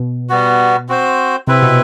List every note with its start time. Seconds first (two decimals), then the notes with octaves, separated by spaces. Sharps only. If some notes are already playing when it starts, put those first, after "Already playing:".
Already playing: B2
0.29 G3 B3 F#4
0.89 C4 F#4 C5
1.47 C3 C4 E4 B4
1.62 B2